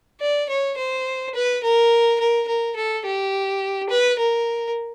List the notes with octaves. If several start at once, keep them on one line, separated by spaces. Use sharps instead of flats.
D5
C#5
C5
B4
A#4
A#4
A#4
A4
G4
B4
A#4